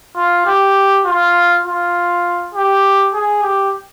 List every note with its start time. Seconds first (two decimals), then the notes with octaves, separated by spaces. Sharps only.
0.16 F4
0.47 G4
1.05 F4
1.65 F4
2.54 G4
3.13 G#4
3.42 G4